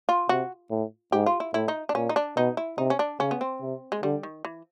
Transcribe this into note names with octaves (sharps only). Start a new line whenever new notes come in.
F4
C3 F#4
A2
G#2 G4
F4
E4
A2 E4
D#4
D4
A#2 C#4
D#4
D4
B2 D#4
E4
C3 D#4
C#4
D4
C#3 C#4
B3
C4
C3
G#3
D3 G3
D#3
E3